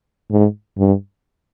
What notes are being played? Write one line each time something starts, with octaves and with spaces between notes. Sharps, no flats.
G#2
G2